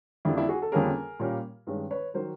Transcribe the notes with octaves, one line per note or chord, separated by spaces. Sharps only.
F2 D3 G3 A#3 D4 E4
D4 E4
F#4 G#4
A4
F2 D3 G3 A#3 C#4 G#4 A#4
A#2 G3 A#3 C#4
G2 D#3 G#3 C#4
B4 C#5
D#3 F#3 A#4 C5